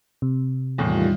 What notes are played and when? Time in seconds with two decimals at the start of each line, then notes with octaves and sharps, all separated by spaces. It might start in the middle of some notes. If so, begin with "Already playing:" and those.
0.22 C3
0.78 E2 A2 D#3 G3 F4